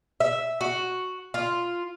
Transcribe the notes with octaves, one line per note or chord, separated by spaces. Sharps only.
E5
F#4
F4